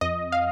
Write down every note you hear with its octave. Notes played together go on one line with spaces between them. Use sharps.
F2 D#5
F5